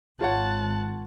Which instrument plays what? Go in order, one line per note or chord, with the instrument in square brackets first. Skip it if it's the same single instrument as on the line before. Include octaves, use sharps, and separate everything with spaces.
[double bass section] G#1 [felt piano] F4 C#5 F#5 [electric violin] A5 F#6